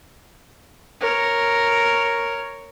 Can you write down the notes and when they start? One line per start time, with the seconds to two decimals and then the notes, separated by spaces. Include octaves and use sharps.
1.01 A#4 C#5